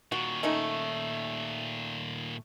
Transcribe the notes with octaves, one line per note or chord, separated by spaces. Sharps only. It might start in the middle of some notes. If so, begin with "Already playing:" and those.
A#2 D#3 F#4
A3 C#4 D#4